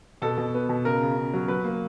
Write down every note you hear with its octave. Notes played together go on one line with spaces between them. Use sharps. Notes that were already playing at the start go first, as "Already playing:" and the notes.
B2 A4
B2
B3
B2
C#3 A#4
C#3
C#3
F#3
F#3 B4
A#3